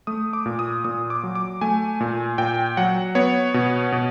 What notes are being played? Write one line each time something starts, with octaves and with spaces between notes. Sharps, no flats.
A3 D#6
D6
A#2
D#6
A#2 D#6
D6
F#3
D6
A3 G#5
A#2
A#2 G5
F#3 F#5
B3 C#5
B2
B2